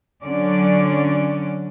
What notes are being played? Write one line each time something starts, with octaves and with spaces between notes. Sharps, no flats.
D3 F#3 C#4 D5